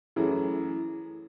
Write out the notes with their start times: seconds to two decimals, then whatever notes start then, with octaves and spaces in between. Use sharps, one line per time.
0.16 F#2 E3 A3 E4 G#4